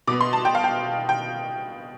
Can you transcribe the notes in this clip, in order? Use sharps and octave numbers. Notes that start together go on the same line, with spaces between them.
B2 B3 D6
C6
A5
G5
F5
G5
G5